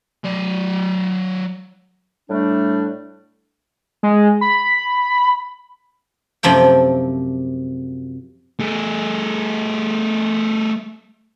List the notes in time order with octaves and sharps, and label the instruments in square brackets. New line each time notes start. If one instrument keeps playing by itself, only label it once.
[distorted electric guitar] F#3 D5
[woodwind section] A2 G3 A3 D4
[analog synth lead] G#3
B5
[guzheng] F#2 C3 F3 A3 G5
[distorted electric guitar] A3 G#4